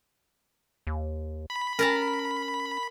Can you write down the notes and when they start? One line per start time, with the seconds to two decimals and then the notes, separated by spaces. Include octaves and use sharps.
0.87 D#2
1.50 B5
1.79 C#4 A#4 A5 A#5